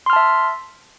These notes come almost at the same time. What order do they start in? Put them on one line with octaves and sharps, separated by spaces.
C6 F6 A5 E5